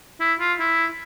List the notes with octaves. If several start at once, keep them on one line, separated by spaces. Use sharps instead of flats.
E4
F4
E4